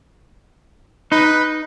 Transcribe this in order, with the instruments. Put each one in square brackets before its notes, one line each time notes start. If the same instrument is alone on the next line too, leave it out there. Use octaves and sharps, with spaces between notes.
[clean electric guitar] D#4 [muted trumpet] B4